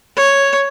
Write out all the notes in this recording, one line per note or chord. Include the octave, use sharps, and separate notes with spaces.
C#5